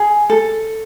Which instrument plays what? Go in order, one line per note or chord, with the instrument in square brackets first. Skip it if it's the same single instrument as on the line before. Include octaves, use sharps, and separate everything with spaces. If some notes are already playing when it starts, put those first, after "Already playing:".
Already playing: [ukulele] G#4
A4